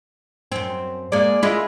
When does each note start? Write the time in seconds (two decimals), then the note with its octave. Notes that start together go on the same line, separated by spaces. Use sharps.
0.52 F#2 C4
1.12 G#3 A#3 D5
1.43 G#3 E4 F4